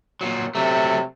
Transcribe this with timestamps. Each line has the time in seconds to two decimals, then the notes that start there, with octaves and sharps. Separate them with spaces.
0.21 A#2 F#3
0.55 C3 F#3 A3